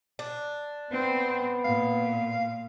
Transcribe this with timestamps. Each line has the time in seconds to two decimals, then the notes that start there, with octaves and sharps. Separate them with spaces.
0.19 D4
0.91 B3 C4
1.65 A#2 F5